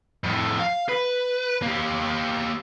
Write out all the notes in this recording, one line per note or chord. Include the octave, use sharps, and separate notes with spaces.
F2 A2
F5
B4
A#3 G4